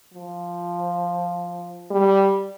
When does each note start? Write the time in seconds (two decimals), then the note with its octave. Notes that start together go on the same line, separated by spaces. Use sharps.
0.13 F3
1.91 G3